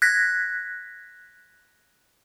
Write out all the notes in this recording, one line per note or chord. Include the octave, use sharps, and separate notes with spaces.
F#6 G#6 A#6 B6